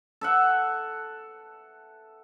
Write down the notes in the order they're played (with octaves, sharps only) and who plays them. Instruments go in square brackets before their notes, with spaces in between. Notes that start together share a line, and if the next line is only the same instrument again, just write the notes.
[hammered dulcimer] A4 E5 F#5